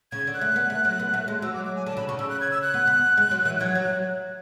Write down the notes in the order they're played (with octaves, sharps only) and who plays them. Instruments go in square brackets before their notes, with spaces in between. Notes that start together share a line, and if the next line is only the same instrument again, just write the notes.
[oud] C#3 [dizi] G#6
[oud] D3
[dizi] F#6
[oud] A3
B3
A3
F#3
B3
A3
G#3
[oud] F#3 [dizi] E6
[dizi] D6
D6
G#5
[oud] D3 [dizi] A5
[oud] C#3 [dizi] B5
[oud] C#3 [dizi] C#6
[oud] C#3 [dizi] E6
[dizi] F#6
G#6
E6
F#6
[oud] B3
B3
G#3
F#3
E3
[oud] F#3 [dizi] G#6
[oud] F#3
[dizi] F#6